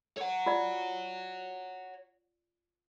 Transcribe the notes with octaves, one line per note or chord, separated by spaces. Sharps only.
C#5 F#5
F4 D5